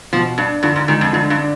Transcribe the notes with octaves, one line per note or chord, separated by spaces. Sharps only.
B2 F3
G2 D4
G2 D3
G#2
D#3 G#3
F2
G2 D3
G2
D4